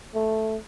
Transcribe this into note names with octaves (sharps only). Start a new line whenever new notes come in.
A3